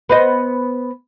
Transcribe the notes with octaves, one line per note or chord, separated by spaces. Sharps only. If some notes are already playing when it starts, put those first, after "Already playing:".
B3 C5 D#5